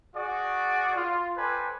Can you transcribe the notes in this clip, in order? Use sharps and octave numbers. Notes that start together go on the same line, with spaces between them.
F#4 G#4 D5
F4
A4 B4 C5 D5 G5 G#5